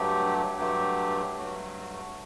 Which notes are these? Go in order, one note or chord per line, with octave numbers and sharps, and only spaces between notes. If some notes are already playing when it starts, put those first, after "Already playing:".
Already playing: G2 F#3 A3 G4
G2 F#3 A3 G4
G2 F#3 A3 F#4